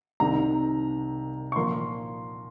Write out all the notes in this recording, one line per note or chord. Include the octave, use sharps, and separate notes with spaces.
C2 C3 D#3 A#5
C#6
A#2 F3 A#3 C6